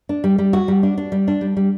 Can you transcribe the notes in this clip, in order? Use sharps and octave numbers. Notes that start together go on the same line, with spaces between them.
D4
G3
G3
F#4
G3
D4
D4
G3
D4
G3
G3